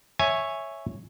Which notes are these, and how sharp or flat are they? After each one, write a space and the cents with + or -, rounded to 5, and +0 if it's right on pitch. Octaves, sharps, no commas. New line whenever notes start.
C#5 -5 E5 +0 G#5 +0